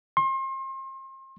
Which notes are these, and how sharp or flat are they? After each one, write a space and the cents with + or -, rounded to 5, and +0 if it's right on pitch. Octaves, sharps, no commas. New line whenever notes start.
C6 +35